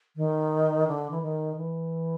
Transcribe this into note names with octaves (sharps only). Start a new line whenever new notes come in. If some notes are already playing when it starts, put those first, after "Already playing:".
D#3
D3
E3
D#3
E3